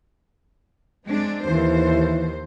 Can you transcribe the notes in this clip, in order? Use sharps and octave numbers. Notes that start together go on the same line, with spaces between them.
G#3 C4 D4
D#2 E3 C5